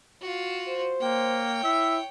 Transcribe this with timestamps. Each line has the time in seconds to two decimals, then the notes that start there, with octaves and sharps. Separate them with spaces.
0.21 F4 F#4
0.68 C5
1.01 A#3 C#5 G5
1.64 E4 E5